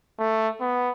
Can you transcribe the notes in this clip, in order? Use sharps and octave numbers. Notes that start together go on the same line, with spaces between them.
A3
B3